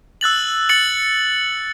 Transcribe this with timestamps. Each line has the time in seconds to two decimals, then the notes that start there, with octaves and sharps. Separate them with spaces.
0.21 E6 F#6 A6 F#7
0.69 E6 A6 C#7 F#7